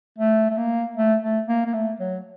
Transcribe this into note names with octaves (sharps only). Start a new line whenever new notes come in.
A3
A3
A#3
A3
A3
A#3
A#3
A3
F#3